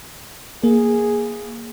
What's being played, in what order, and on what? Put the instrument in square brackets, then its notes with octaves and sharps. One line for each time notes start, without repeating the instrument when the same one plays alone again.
[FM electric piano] A#3 [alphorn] G#4